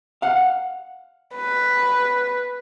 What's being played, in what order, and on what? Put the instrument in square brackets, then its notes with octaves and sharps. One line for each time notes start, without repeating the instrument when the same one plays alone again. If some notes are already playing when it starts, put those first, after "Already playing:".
[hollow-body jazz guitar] F5 F#5
[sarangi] B4